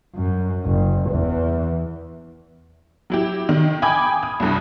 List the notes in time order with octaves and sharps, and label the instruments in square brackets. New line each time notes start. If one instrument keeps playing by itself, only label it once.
[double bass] F#2
F#1
E2 E3
[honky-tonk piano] F#3 E4 G4
D#3
G5 G#5 B5 D6 D#6 G#6
D#6
C2 G2